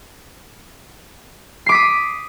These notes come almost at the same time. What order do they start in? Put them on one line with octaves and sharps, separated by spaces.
C7 D6 B6 D#6